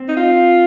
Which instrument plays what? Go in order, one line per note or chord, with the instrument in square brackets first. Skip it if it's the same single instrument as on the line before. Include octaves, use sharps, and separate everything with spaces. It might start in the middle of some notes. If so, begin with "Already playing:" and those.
Already playing: [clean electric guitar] C4
[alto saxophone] D#4
F4